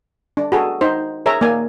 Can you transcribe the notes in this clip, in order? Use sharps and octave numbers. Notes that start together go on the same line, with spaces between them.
D4
F#4 G#4 A4
D#4 C5
G#4 A#4 C#5 E5 A#5
A#3 D5 G#5